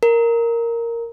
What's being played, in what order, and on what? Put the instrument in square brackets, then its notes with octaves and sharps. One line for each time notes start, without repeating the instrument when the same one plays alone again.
[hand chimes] A#4